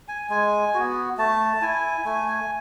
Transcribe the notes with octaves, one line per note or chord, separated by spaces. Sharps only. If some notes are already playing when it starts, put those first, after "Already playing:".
G#5
G#3 G#5
B3 F#4
A3 A5
E4 G#5
A3 G#5
G#5